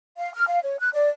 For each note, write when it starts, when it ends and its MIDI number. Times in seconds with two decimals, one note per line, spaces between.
0.18 0.33 77
0.34 0.46 89
0.48 0.60 77
0.63 0.77 73
0.79 0.89 90
0.94 1.09 74